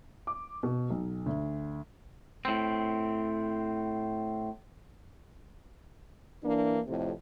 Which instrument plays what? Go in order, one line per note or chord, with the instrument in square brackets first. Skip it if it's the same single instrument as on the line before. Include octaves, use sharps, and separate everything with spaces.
[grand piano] D6
B2
B1
D2
[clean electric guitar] A2 C4
[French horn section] E3 A#3 D4
F2 A2 C3